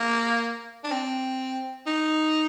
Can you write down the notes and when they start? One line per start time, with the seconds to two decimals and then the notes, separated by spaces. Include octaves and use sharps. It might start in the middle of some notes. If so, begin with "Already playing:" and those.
Already playing: A#3
0.84 D4
0.91 C4
1.86 D#4